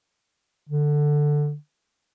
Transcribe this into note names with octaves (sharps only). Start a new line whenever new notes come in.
D3